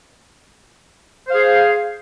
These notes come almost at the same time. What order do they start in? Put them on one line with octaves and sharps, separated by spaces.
C5 F5 G#4